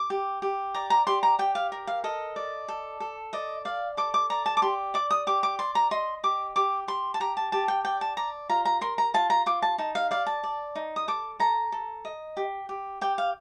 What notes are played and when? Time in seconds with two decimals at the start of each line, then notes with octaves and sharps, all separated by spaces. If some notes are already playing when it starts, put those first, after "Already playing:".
Already playing: D6
0.10 G4
0.42 G4
0.74 D5 A#5
0.90 A#5
1.07 G4 C6
1.23 A#5
1.39 G4 G5
1.55 F5
1.72 A#4
1.87 F5
2.04 A4 D#5
2.36 D5
2.68 A4
3.00 A4
3.33 D5 D#5
3.65 D5 F5
3.97 A4 D6
4.14 D6
4.30 D5 A#5
4.46 A5
4.57 D6
4.62 G4 C6
4.94 D5 D6
5.11 D#6
5.27 G4 D6
5.43 D6
5.59 D5 C6
5.75 A#5
5.91 D#5 C6
6.23 G4 D6
6.56 G4 D6
6.88 G4 C6
7.14 A5
7.20 G4 A#5
7.37 A5
7.52 G4 A5
7.68 G5
7.85 D5 G5
8.01 A5
8.17 D5 A#5
8.49 F4 A#5
8.65 A#5
8.81 A#4 C6
8.98 A#5
9.14 F4 A5
9.30 A#5
9.46 F4 D6
9.62 A5
9.78 D#4 A5
9.95 F5
10.11 D5 F5
10.26 A5
10.43 D5
10.75 D#4
10.96 D#6
11.08 A4 D6
11.39 A4 A#5
11.72 A4
12.05 D#5
12.37 G4
12.69 G4
13.01 G4 G5
13.18 F5